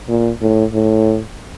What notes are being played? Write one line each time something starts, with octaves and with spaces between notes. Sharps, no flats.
A#2
A2
A2